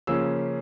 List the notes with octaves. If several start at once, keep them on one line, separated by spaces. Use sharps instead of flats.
C#3 F3 A#3 C#4 E6